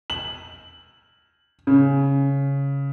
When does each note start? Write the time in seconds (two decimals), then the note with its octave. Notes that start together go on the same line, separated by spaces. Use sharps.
0.10 F#7
1.67 C#3